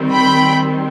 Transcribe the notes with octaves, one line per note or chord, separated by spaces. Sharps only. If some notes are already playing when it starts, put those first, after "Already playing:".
Already playing: D#3 G3 C4
G5 B5